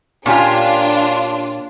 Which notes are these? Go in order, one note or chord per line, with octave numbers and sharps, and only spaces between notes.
A#2 C#4 D4 F4 G4